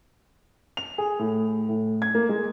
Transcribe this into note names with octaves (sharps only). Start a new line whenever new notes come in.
F7
G#4
A2
A2
G#6
A#3
G#3